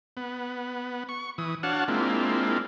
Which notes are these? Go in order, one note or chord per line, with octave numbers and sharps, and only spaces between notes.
B3
C#6
E3 D#6
D4 F#4 C#5 F5 F#5 A5
G#3 A#3 C4 D4 E4 F4